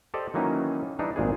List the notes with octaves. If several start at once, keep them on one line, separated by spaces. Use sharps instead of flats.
G4 A4 C5 D5 D#5
D#3 E3 F#3 A#3 C#4 D#4
E3 G3 D4 D#4
G#1 A#2 D4 G#4